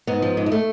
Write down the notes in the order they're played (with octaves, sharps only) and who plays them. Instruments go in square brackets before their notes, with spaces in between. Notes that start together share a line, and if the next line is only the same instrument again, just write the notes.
[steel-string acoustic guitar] G#2 B3
F3
G#2
G#3
A3